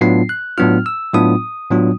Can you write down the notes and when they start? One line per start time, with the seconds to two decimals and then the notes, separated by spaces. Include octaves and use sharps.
0.01 A2 F#3 B3 D4 F4 C7
0.29 F#6
0.58 A2 F#3 B3 D4 F4 F6
0.86 E6
1.14 A2 F#3 B3 D4 F4 D#6
1.71 A2 F#3 B3 D4 F4